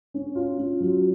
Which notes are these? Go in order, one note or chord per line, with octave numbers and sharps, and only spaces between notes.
C#4
F4
C#4
F#3